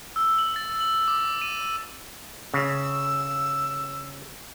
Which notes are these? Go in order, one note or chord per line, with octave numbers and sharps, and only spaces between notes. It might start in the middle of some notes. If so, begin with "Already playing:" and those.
E6
F#7
A6
F#7
D6
D#7
C#3 E6